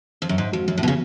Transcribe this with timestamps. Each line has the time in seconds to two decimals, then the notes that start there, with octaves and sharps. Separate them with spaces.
0.22 F2
0.29 F#2
0.38 G#2 G#3
0.53 F2 F#4
0.68 F#2 F3
0.78 A2
0.83 B2 B3
0.88 C#3